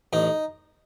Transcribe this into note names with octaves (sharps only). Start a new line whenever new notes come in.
A1 D#4